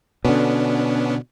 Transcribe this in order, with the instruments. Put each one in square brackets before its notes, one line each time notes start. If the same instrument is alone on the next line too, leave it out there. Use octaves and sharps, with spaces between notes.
[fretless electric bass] B2 D3 [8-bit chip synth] B3 C#4 D4